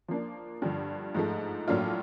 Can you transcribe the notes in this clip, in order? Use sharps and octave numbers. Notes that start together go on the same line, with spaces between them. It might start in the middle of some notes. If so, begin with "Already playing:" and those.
F3 A#3 D4
G2 D3 F3
G#2 F3 A3
A2 F#3 A#3 D4 F4